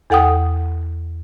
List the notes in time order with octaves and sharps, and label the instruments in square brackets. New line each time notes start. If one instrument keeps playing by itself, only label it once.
[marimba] E2 A4 F#5 G5 D#6